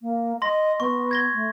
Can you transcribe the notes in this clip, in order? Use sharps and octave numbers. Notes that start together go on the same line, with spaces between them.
A#3
D#5 C6 A#6
B3 C#6
G#6 A#6 G7
A3